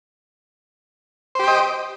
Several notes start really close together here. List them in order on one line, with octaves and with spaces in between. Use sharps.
C5 G4 G5 D#5